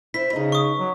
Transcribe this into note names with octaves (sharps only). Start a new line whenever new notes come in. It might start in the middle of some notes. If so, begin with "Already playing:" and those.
E4 C5 B6
C#3 D#4 B4 D#5
C#6 D#6
F#3